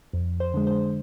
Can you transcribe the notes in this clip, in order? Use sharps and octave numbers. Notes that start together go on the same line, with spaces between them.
F2
C5
D3 G#3
C5